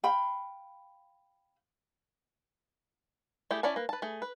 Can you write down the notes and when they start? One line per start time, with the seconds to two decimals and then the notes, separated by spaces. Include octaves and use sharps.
0.03 F5 G5 B5
3.51 A3 E4 G4 G#4
3.63 C#4 E4 C#5 D5 A5
3.76 A#3 B4
3.89 B4 A5
4.02 A3 G#4
4.22 B4